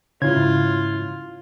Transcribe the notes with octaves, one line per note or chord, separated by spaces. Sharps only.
G#2 C#3 E4 F4 G#6